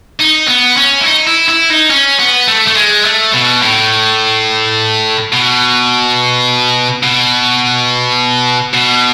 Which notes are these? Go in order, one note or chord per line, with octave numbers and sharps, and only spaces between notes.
D#4
B3
C#4
E4
D#4
E4
E4
D#4
C#4
B3
A3
A3
G#3
A3
B2
A2
B2
B2
B2